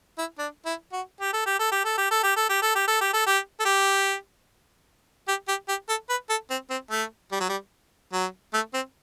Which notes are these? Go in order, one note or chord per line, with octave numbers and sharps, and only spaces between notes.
E4
D4
E4
F#4
G4
A4
G4
A4
G4
A4
G4
A4
G4
A4
G4
A4
G4
A4
G4
A4
G4
A4
G4
G4
G4
G4
A4
B4
A4
C4
C4
A3
G3
F#3
G3
F#3
A3
C4